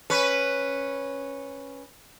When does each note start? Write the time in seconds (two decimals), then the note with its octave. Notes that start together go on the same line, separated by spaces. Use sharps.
0.10 C#4 B4